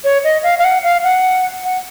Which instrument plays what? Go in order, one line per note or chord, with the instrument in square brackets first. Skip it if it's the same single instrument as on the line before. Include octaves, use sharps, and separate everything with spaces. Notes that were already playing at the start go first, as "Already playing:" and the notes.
[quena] C#5
D#5
F5
F5
F#5
F5
F#5
F#5